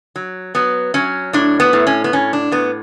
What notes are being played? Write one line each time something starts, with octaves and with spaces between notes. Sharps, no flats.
F#3
F#3 B3
F#3 C#4
A2 D4
B3
A2
C#4
B3
A2 C#4
D4
A2 B3